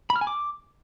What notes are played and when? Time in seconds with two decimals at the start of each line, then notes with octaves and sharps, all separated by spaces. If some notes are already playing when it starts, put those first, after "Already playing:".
0.10 B5
0.16 F6
0.21 G#5
0.27 D6